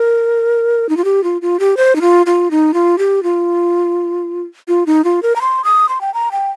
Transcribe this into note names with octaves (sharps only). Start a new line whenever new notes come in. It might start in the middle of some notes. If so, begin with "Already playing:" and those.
Already playing: A#4
D#4
F4
G4
F4
F4
G4
C5
D#4
F4
F4
D#4
F4
G4
F4
F4
D#4
F4
A#4
A#5
C6
D#6
C6
G5
A#5
G5